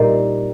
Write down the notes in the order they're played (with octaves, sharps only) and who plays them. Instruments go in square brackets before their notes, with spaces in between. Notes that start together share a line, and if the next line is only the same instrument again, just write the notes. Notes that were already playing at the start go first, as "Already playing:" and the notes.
Already playing: [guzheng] A#2 G3 C4 D#4